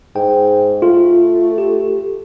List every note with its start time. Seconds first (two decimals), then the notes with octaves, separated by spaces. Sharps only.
0.16 G#2 G5
0.82 A3 F4
1.58 G4